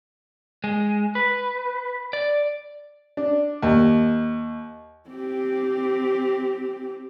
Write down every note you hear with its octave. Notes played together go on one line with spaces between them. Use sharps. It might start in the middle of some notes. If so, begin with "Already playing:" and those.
G#3
B4
D5
D4
D#2
C4 G4